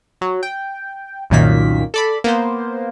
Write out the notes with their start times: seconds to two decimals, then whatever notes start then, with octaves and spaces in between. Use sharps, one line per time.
0.21 F#3
0.43 G5
1.30 C2 F#2 A#2 D#3 A#3 B6
1.94 A4 D5 B5
2.24 A#3 B3 C5